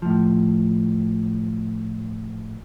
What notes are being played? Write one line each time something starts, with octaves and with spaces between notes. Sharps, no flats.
A2 F3